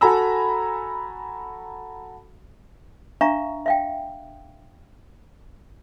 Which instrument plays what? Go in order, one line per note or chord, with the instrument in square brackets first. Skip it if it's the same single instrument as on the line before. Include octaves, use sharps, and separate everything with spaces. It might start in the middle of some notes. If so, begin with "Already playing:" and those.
[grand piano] F#4 A4 G#5 A#5 B5 E6
[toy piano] D4 E5 F5 A#5 C#6
E5 F5 G5